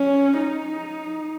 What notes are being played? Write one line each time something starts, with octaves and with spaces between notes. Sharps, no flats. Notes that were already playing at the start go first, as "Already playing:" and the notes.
Already playing: C#4
D#4